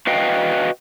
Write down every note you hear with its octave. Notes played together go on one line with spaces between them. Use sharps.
F#4 B4 D#5 F5 G5